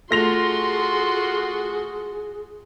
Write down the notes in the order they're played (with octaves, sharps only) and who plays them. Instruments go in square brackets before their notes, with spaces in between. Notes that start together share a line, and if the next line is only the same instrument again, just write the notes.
[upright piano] A3 A#6 F7 [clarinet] F4 [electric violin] F#4 C6 [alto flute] G#4